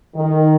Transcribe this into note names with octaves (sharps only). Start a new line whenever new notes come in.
D#3